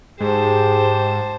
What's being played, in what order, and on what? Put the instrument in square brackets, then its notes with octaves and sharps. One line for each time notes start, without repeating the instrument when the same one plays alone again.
[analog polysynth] G#2 [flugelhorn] G4 [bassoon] G#4 [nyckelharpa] C5 A5